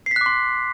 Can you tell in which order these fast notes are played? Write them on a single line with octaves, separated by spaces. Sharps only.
C7 B6 F#6 D6 C6